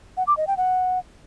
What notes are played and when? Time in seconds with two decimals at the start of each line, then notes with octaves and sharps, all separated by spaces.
0.17 F#5
0.27 D6
0.37 D#5
0.47 G5
0.57 F#5